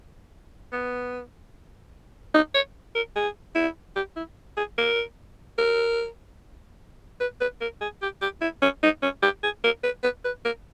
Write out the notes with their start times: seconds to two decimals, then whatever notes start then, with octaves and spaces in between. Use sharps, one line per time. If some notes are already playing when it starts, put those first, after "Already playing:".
0.73 B3
2.34 D#4
2.54 C#5
2.95 A#4
3.16 G#4
3.55 E4
3.96 G4
4.16 E4
4.57 G#4
4.78 A#4
5.58 A#4
7.21 B4
7.41 B4
7.61 A#4
7.81 G#4
8.02 G4
8.22 G4
8.42 E4
8.62 C#4
8.83 D#4
9.02 C#4
9.23 G4
9.43 G#4
9.64 A#4
9.84 B4
10.03 B4
10.25 B4
10.45 A#4